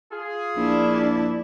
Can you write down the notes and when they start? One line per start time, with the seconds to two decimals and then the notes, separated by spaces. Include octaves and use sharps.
0.11 F4 G#4
0.57 A#1 D4 E4